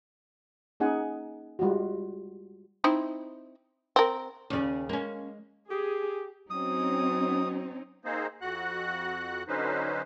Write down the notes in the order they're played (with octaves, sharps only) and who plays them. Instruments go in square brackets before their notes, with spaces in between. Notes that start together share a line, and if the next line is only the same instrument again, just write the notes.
[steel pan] A#3 C#4 D#4 G#4 F#5 G#5
G3 G#3 F4 F#4
[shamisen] C4 D#4 E4
C4 A#4
[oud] D#2 C#3 [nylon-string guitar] C#4 D5 G#5
[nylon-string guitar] G#3 [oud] A#3 C#4
[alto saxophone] G4 [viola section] G#4
[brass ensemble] F#3 [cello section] C4 C#4 D#4 [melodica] D#6
[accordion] A#3 C4 D#4 G#4 C5
F2 F#4 F#5 F#6
D3 F#3 C#4 D#4 B4 C5